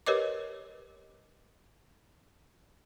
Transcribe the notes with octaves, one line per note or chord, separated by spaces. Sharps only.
G4 A#4 B4 C#5 D#5 D6